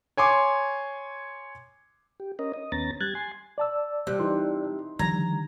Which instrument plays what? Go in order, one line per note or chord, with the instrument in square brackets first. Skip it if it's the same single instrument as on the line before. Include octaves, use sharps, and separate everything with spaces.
[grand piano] C#5 G#5 C6 D6
[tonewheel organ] G4
C#4 A#4 D#5
D#5
D#2 B3 C#4 A#5 A6
G3 F#6 G#6 A6
G#5 C6
[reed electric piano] D5 A5 E6
[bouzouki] C3 [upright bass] G3 [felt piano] F#6
[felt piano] E3 D#4 C6
[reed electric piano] D3 D#3 G3 [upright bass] F3 [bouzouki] A#5 [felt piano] G#6